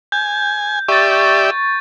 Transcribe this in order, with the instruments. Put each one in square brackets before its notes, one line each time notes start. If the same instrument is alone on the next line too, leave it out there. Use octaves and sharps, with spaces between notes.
[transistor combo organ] G#5 [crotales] G6
[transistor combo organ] G4 D5 E5 [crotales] C#6 A6